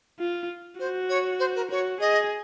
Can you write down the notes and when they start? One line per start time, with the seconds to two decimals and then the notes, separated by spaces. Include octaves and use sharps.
0.19 F4
0.80 F#4 C5
1.09 C#5
1.40 C5
1.56 A#4
1.71 F#4 C#5
2.00 G#4 D#5